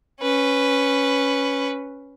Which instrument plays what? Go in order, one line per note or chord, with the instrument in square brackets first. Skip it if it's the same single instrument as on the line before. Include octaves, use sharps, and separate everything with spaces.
[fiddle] C#4 B4